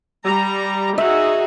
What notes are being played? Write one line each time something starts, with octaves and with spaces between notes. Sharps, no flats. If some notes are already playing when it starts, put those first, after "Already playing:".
G3 A#5
D#4 F#4 G#4 E5